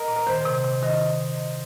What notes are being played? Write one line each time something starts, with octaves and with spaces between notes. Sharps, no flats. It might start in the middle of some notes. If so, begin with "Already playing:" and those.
Already playing: A#4 D#5
A#2
A#4
D#3 C5
C3
C3
D#3 D#5